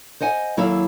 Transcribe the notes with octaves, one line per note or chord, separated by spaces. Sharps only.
C5 D#5 F#5 G#5
D#2 F#3 E4 A4 F5